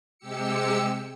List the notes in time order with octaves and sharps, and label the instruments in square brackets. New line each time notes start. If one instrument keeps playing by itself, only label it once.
[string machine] C3 G#3 G4 E6 C#7